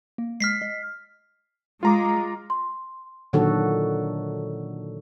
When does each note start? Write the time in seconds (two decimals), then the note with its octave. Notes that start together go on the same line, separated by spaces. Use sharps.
0.18 A#3
0.40 G#3 F6 B6 C7
0.62 D#5
1.83 G#3 F4 A#5 D6
2.50 C6
3.33 A#2 D3 D#3 F#3 F#4 A4